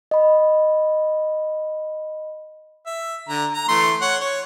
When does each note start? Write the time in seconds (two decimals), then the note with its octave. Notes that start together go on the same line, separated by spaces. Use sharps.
0.11 D#5 B5
2.86 E5
3.29 D3 A#5
3.54 A#5
3.68 E3 A3 C6
4.01 C#5 F#5
4.21 C#5